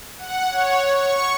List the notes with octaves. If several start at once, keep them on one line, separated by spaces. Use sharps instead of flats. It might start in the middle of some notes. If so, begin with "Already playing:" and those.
F#5
C#5
C#6